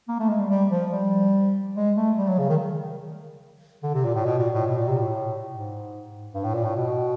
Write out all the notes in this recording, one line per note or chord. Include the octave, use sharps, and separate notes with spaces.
A#3
A3
G#3
G3
G3
F3
G3
G#3
A3
G3
F#3
C#3
D#3
D3
C3
A#2
A2
B2
A#2
A2
B2
A#2
C3
A2
G#2
G2
A2
A#2
A2
B2